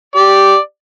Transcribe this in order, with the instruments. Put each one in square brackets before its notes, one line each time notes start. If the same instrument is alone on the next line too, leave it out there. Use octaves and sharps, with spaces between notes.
[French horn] G4 [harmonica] D5